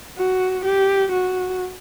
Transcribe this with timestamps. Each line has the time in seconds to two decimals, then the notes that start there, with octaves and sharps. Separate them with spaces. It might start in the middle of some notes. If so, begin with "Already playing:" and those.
0.18 F#4
0.65 G4
1.12 F#4